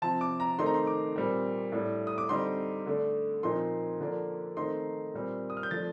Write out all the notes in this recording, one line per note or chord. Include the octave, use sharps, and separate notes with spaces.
C3 F3 C4 A5
D6
A#5
D#3 A3 C4 D#4 C6
A#5
C6
D6
A#2 G3 C4
A2 G3 D4
D#6
D6
D3 G3 C4 D#4 C6
D3 A3 D4
A#2 F3 C4 D#4 C6
D3 F3 A#3 D4
D#3 A3 C4 D#4 C6
A#2 G3 C4
D#6
F6
G6
F3 A3 D4 A6